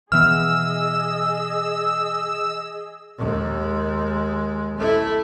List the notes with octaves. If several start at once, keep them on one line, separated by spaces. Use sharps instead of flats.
B2 E3 B3 G#4 D#5 E6 F6
D#2 G#3
A3 E4